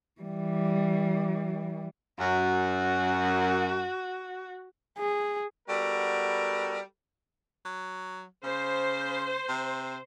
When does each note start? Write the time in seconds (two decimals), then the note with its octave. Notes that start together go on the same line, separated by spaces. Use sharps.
0.21 E3 G3
2.20 F#2 F#4
4.98 G#4
5.68 G3 B3 F#4 A4 A#4
7.65 F#3
8.44 C#3 C5
9.49 C3